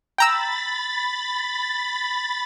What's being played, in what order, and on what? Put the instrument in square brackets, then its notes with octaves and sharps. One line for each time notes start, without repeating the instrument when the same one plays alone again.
[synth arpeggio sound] G5 A#5 E6 [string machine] B5 A6